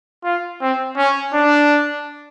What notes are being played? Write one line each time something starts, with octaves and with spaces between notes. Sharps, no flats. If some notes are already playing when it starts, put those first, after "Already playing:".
F4
C4
C#4
D4